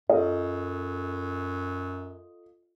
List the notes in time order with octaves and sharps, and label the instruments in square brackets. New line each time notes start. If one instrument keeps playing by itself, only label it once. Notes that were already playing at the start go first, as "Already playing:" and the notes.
[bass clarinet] F#2 [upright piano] F4 A4 D#5